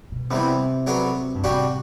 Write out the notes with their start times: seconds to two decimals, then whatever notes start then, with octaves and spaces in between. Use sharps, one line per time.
0.12 B2
0.30 C3 E3 G3 B3
0.87 F#3 B3 D4 A4
1.35 G2
1.43 A2 C3 G3 D4 F#4